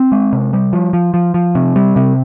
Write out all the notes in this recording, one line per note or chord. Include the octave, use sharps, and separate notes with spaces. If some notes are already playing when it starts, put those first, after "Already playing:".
Already playing: C4
G#3
C3
G3
F3
F3
F3
F3
C3
G3
C3